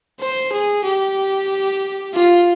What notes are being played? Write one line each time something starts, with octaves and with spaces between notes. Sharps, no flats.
C5
G#4
G4
F4